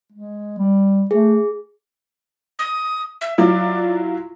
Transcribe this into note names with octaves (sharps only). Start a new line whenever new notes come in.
G#3
G3
A3 G#4
D#6
E5
F#3 E4 F4 D5